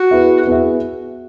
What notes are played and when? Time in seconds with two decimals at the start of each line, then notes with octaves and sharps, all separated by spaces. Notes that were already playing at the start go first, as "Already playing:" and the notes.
Already playing: F#4
0.11 B3 E4 G#4 B4 E5
0.47 B3 E4 G#4 B4 E5